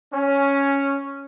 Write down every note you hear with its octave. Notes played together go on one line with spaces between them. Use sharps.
C#4